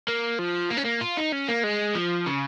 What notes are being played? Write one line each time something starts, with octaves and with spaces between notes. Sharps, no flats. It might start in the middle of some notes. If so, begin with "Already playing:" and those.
A#3
F3
A#3
C#4
A#3
F4
D#4
C#4
A#3
G#3
F3
C#3